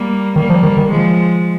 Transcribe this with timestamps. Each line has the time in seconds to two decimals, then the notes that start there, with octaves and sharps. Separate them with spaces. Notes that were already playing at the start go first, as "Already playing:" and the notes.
Already playing: G3 A#3
0.36 D#3 G3 A#3
0.50 F3
0.63 D#3
0.77 D#3
0.90 F3 G#3